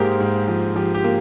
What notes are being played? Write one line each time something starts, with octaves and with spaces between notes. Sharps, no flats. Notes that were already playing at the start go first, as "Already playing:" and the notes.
Already playing: G#2 A#3 G4 G#4 A#4 C5
G#2
F3
F3 G4
G4
A#3